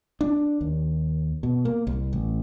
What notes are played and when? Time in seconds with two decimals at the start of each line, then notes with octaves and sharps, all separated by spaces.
0.21 D4
0.61 D#2
1.43 B2
1.65 A#3
1.87 C2
2.13 A1